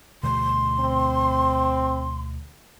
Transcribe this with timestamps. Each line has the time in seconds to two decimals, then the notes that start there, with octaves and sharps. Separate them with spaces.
0.23 D2 B2 D3 C6
0.80 C4